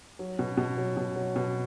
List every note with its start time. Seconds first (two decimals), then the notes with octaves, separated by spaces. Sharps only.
0.19 F#3
0.39 B2
0.57 B2
0.77 F#3
0.97 B2
1.16 F#3
1.36 B2